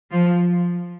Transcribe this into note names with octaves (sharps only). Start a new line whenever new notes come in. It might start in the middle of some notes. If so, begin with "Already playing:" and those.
F3